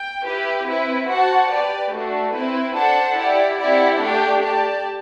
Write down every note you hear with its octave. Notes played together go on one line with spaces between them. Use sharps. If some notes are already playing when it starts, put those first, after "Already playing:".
Already playing: G5
E4 G4 B4
C4 E4 B4
F#4 C5 F#5 A5
G4 B4 D5
A3 D4 F#4
C4 E4 B4
D4 A4 C5 F#5 A5
E4 G4 D5 F#5
C4 E4 G4 D5 F#5
A3 D4 G4
G4 D5 A5